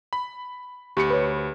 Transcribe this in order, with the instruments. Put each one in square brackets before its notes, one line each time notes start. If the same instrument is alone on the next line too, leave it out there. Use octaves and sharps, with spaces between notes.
[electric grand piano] B5
[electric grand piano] D2 B5 C#7 [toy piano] G4
[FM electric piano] B4 C#5